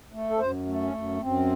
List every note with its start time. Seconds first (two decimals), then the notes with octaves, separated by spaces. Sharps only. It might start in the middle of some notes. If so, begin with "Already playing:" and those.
0.12 A3
0.30 A4
0.39 F#2 C5
0.66 A3
0.81 C#4
0.94 F#2
1.21 F#2 C4